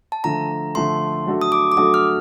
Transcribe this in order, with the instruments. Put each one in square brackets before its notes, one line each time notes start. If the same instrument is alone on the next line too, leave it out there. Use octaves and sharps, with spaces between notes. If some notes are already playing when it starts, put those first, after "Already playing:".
[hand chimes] A5
[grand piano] D3 F3 A3 [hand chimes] A#5
[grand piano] D3 F3 A3 [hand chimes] C6
[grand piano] F#3 A3 D4 F#4 A4
[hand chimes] D#6
D6
D6
[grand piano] F#3 A3 D4 F#4 A4 [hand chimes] D#6
[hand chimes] F6